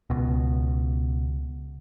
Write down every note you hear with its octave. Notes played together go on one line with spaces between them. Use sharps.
C#2 B2